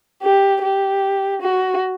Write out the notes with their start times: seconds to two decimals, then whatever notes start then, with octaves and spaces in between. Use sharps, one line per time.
0.23 G4
0.62 G4
1.42 F#4